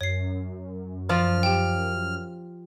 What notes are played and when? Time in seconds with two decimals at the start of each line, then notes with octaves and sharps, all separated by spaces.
0.01 F#2 C#5 C7
1.09 F3 F4 D5 F6
1.43 G4 G5